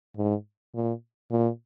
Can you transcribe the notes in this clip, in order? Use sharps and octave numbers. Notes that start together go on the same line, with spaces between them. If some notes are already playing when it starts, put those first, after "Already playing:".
G#2
A#2
A#2